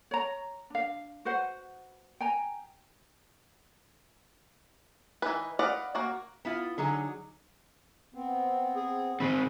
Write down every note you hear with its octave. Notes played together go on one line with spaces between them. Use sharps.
C#5 A#5
D4 F5
F#4 B4 C5 F#5
G5 G#5 A#5
E3 D#4 B4
B4 D5 D#5 F5 F#5
A#3 F#4
B3 E4 F4
D3 F#3 D#4 G#4
B3 C4
G#4
D#3 C4 B5